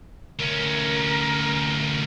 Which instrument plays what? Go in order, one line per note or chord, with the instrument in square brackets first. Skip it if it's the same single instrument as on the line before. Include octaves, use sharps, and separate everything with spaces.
[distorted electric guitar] D2 C#4 [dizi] A#4